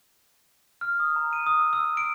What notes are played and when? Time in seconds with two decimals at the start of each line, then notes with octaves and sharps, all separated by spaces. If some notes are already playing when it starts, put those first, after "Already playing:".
0.81 F6
1.00 D#6
1.16 A#5
1.33 D#7
1.47 D#6
1.60 E6
1.73 E6
1.97 D7